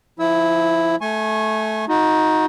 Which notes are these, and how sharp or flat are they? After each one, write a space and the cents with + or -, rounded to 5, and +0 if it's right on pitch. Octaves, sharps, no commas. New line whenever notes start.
F3 -25 E4 +0 E6 -25
A3 -10 G#5 +10 C#6 -30
D#4 +15 F#4 -30